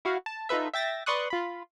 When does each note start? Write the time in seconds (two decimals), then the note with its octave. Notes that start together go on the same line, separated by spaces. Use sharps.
0.05 E4 F#4 F5
0.26 A5
0.49 D#4 F4 A4 B4 E5
0.74 E5 G5 A6 A#6
1.06 B4 D5 C6 C#6 D#6 F#6
1.30 F4 B5